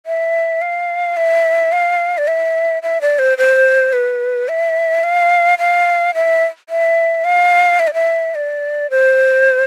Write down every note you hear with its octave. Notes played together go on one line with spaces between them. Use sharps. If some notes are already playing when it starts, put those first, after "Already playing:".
E5
F5
E5
F5
D5
E5
E5
D5
C5
C5
B4
E5
F5
F5
E5
E5
F5
E5
D5
E5
D5
C5